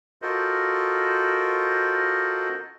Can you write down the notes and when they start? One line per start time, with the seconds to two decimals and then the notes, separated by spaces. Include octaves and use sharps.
0.22 F4 F#4 A4 A#4 C5 D#5